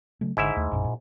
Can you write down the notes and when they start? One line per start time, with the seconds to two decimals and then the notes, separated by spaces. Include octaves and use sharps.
0.21 C#3 F#3 A3
0.37 G#1 G#2 D3 E4 E5
0.56 D#2 A3
0.71 A#1 F#2 A#2
0.84 A#2